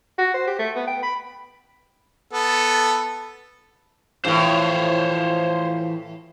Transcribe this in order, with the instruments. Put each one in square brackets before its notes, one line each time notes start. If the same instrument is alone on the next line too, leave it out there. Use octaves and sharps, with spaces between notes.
[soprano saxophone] F#4
C5
G4
A3
B3
G5
B5
[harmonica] B3 A4
[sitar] F#2 A2 [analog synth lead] E3 [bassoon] F3 [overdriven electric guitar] C5 C#5